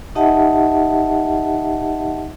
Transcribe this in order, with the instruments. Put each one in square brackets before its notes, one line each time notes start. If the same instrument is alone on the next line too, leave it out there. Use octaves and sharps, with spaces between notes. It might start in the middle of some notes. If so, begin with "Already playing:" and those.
[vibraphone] D#4 G4 D#5 E5 F#5 A5